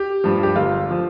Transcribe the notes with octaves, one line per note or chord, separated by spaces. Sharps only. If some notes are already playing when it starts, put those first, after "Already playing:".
Already playing: G4
G2 F3
G4
G1 F4
F3